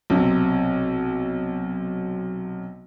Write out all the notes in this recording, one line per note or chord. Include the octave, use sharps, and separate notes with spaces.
B1 C3